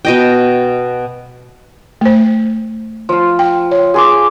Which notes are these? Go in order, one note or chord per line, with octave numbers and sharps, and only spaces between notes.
B2 D#5 G5
A3 C5
F3 F4
G5
C#5
G#4 C6 D6